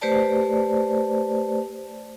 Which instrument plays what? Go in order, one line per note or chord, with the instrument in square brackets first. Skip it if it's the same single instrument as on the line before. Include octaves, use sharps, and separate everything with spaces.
[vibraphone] A3 G4 B4 C5 D5 A5